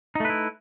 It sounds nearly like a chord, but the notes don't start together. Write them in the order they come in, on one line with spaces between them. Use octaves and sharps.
D#4 A3 B4 E4